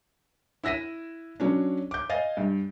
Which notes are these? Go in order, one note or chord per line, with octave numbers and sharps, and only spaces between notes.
E4 E6 A#6 B6 D#7
F#3 C#4 D4
D6 G6
D#5 F5 G#5 A6
G2